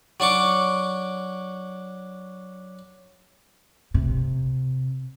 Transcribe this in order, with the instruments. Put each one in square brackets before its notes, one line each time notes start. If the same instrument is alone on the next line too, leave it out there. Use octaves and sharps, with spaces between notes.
[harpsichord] F#3 D4 C#6 D6
[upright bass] C3